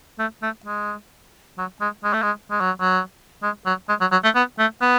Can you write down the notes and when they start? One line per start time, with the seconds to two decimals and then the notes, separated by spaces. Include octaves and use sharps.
0.19 A3
0.42 A3
0.65 G#3
1.58 F#3
1.81 G#3
2.04 G#3
2.13 A3
2.22 G#3
2.51 G#3
2.60 F#3
2.81 F#3
3.43 G#3
3.66 F#3
3.89 G#3
4.01 F#3
4.12 F#3
4.24 A3
4.35 B3
4.59 A3
4.82 B3